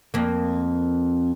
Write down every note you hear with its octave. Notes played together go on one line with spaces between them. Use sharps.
F2 A#3